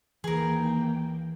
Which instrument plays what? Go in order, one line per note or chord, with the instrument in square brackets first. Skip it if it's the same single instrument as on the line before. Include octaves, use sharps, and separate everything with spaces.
[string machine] D#2 A#3 G5 [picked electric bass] E3 [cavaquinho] G#4 A#4